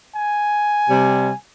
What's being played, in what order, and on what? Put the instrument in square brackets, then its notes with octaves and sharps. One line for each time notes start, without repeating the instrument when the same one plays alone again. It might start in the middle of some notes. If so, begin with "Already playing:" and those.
[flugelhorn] G#5
[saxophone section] C3 G3